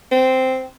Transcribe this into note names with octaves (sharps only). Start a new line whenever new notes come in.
C4